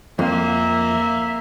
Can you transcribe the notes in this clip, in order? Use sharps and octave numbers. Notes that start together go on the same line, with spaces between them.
F2 A#3 E5